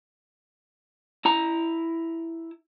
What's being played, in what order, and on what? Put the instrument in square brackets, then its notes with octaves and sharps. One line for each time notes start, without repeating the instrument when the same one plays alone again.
[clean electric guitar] E4 A#5